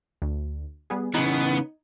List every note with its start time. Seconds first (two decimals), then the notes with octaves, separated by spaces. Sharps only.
0.22 D2
0.90 G3 B3 G#4
1.14 C#3 E3 B3 D#4